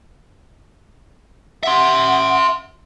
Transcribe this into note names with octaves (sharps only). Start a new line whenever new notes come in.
E5 F#5 C6